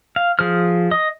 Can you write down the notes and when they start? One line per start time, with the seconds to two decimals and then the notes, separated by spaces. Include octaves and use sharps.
0.16 F5
0.39 F3 G#4 C5 F6
0.91 D#5 D#6